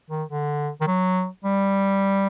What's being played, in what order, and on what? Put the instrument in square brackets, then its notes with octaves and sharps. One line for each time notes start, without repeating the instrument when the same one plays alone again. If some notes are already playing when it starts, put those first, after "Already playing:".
[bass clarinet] D#3
D3
D#3
F#3
G3